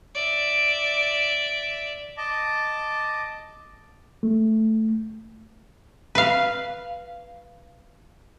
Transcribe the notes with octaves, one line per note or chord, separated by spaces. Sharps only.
D5 E5
D#5 A5 D6
A3
B4 F5